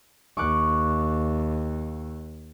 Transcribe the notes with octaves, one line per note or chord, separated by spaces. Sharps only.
D#2 C#6 D6 F#6